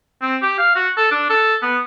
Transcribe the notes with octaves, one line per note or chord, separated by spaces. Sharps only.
C4
G4
F5
F#4
A4
D4
A4
B3